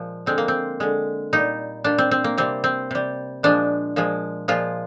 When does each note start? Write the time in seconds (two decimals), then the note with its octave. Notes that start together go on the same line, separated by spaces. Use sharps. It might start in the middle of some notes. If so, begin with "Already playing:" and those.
Already playing: A#2 F3 G#3
0.26 D3 G#3 C4
0.38 A#3
0.48 C4
0.80 D3 G#3
1.33 A#2 G3 D#4
1.84 A#2 G3 D4
1.98 C4
2.11 C4
2.24 A#3
2.38 C3 G3 C4
2.64 C4
2.91 C3 G3
3.43 A#2 F3 G#3 D4
3.96 A#2 F3 G#3
4.48 A#2 F3 G#3 F4